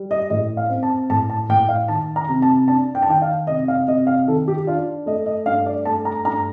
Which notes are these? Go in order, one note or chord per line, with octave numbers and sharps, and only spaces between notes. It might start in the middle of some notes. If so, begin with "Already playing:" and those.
Already playing: G3
D#5
A2 D#5
F5
C4
A5
A2 A5
A5
A2 G5
F5
D#3 A5
A#5
C3
A5
D4 A5
G5
A5
D#3 G5
F5
C3 D#5
F5
C3 D#5
F5
D#3 A4
G4
D4 F4
A3 D#5
D#5
G2 F5
D5
A3 A5
A#5
G2 A#5